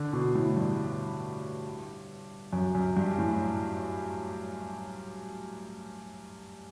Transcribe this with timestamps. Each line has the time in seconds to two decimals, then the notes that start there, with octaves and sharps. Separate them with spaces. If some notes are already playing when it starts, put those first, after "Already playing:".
Already playing: D3
0.13 B2
0.35 A2
0.57 G2
2.53 F#2
2.75 F#2
2.97 G2
3.19 A2